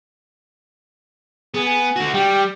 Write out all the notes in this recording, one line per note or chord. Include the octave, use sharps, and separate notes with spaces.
B3 G#4
G#5
D3 F#4
G3 G5